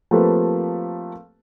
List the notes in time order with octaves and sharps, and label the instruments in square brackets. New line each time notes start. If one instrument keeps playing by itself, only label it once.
[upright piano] F3 A3 A#3 C4 G4 B4